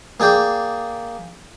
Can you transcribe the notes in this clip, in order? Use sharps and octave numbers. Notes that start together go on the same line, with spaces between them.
A#3 G#4 D5 G5